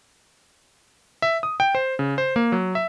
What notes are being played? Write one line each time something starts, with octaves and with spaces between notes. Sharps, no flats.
E5
D#6
G5
C5
C#3
C5
A#3
F#3
E5